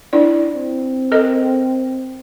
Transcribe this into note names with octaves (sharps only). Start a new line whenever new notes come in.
D4 E4 D5
C4
A4 A#4 D#5